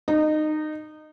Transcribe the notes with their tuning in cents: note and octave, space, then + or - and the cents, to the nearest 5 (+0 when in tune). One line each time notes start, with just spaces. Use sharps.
D#4 -20